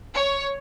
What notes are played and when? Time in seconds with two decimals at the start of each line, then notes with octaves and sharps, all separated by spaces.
0.14 C#5